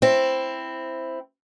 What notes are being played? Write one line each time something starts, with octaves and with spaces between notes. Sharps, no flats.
C4 E4